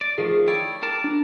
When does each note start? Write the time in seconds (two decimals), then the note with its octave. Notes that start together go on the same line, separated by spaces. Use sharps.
0.01 D5
0.18 D#3 F3 A3 G#4
0.48 E4 C#5 D5 G5
0.83 A#4 A5 D6
1.04 D4